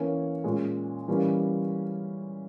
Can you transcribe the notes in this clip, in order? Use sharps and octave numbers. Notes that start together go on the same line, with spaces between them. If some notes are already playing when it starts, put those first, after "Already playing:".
Already playing: E3 A#3 C#4 C#5
A#2 G#3 C#4
E3 G3 A#3 C#4